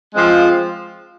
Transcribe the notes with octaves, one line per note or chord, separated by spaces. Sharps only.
F3 G#3 C4 F4